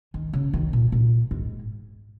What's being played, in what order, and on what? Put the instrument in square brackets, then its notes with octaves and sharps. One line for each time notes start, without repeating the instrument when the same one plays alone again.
[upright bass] D#3
C#3
D#3
A#2
A#2
G#2